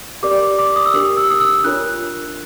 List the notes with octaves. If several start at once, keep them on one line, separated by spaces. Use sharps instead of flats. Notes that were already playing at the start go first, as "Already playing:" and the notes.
G4 A#4 D5 D6
D6
D#6
E6
D4 G4 A#4 D#6
E6
D#6
E6
D4 F4 A#4 C#5 F#6